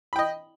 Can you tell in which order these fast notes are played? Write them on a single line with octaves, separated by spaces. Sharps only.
B5 G5 D#5